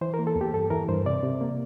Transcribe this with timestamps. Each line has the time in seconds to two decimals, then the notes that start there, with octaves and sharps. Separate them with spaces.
0.01 E3 C5
0.14 A#4
0.19 A#3
0.27 A4
0.36 E2
0.41 G4
0.53 G2 A4
0.70 E3 A#4
0.89 G2 C5
1.06 C3 D5
1.23 C3
1.41 A#3